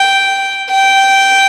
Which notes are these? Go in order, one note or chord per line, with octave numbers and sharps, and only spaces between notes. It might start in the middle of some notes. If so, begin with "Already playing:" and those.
Already playing: G5
G5